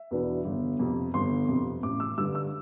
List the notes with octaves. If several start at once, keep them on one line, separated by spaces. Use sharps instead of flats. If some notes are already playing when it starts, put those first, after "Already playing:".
Already playing: E5
E2 B2 B3 D4
G1
F2 C3
G1 C6
F2 C3
A1 D6
E6
G2 D3 G3 E6
E6